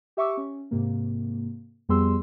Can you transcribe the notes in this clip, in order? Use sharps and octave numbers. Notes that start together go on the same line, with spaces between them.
G4 E5 C#6 D6 E6
C#4
G#2 C3 A#3
F2 G3 B3 G#4 C6 E6